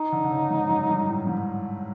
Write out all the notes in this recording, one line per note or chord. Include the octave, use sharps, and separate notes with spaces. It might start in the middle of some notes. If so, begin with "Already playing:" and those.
Already playing: D#4
D3
D3
C#3
G#2
F#2
G2
A2
G#2